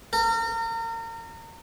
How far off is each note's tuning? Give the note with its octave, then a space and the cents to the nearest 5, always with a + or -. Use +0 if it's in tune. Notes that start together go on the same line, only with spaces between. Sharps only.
A#4 -35